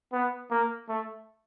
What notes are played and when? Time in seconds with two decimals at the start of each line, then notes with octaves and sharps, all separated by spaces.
0.13 B3
0.51 A#3
0.89 A3